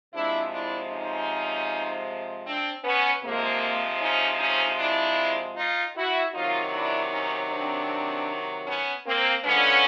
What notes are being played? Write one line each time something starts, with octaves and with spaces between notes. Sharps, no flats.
C3 F3 G#3 D4 E4
D4 E4
C#4 D#4
C4 D4
B3 C#4
C3 F3 G#3 A#3
C#4 D#4
C#4 D#4
D4 E4
D#4 F4
E4 F#4
C3 D#3 F#3 D#4 F4
D4 E4
C#4 D#4
C4 D4
B3 C#4
A#3 C4
D3 F3 G#3 B3 C#4